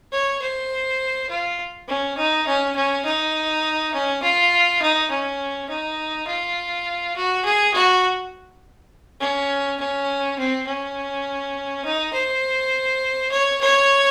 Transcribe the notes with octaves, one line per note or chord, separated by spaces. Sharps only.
C#5
C5
F4
C#4
D#4
C#4
C#4
D#4
C#4
F4
D#4
C#4
D#4
F4
F#4
G#4
F#4
C#4
C#4
C4
C#4
D#4
C5
C#5
C#5